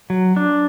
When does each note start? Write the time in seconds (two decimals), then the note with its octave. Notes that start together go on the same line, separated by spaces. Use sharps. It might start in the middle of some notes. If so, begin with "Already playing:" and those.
0.10 F#3
0.37 D4